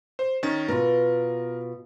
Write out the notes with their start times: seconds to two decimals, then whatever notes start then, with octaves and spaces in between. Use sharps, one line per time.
0.19 C5
0.43 D#3 C#4 A6
0.68 B2 F4 A#4